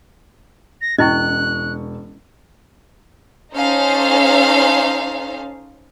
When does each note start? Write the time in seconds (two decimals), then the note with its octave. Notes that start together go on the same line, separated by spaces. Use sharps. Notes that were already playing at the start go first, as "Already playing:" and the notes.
0.81 A#6
0.98 E1 C#4 E4 D#5 C#6 F#6
3.55 C#4 D#4 A4 C5 F5